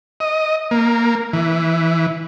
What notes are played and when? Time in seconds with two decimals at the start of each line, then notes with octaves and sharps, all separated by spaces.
0.20 D#5
0.71 A#3
1.33 E3